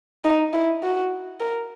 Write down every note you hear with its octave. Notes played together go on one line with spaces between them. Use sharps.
D#4
E4
F#4
A#4